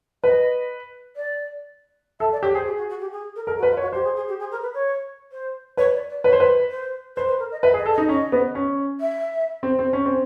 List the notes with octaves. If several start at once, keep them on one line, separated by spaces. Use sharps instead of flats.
B4 D#5
D5
A4 E5
D5
G4 C#5
G#4 C5
G4
F#4
F#4
G4
G#4
A#4
A4 A#4
F#4
B4
F4
C#5
F#4
G4 C5
G#4
G#4
G4
G#4
A#4
B4
C#5
C5
B4 C#5
D5
D5
B4 C#5
C5
B4
C5
B4 C5
B4
A#4
D#5
B4 E5
G#4
D#5
A4
D#5
D#4
C#4 D#5
B3
C#4
E5
C4
C4
C#4
C4